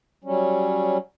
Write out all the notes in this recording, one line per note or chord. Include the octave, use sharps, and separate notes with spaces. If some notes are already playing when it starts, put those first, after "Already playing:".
F#3 G3 C#4